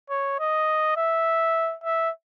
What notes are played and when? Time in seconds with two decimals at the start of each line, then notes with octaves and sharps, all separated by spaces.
0.10 C#5
0.40 D#5
0.97 E5
1.84 E5